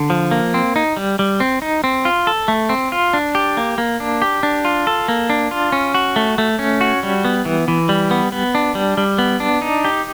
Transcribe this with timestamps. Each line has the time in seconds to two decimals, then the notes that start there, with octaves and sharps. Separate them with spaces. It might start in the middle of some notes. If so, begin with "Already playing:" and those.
Already playing: D3
0.10 F3
0.31 A#3
0.54 C4
0.76 D#4
0.97 G3
1.19 G3
1.40 C4
1.62 D#4
1.84 C4
2.05 F4
2.27 A4
2.48 A3
2.69 C4
2.92 F4
3.13 D4
3.35 G4
3.57 A#3
3.78 A#3
4.00 D4
4.22 G4
4.43 D4
4.65 F4
4.87 A4
5.08 A#3
5.30 D4
5.51 F4
5.72 C#4
5.94 F#4
6.16 A3
6.38 A3
6.59 C#4
6.81 F#4
7.03 G3
7.25 B3
7.45 E3
7.68 E3
7.89 G3
8.11 B3
8.32 B3
8.55 D4
8.75 G3
8.97 G3
9.18 B3
9.40 D4
9.62 D#4
9.85 G4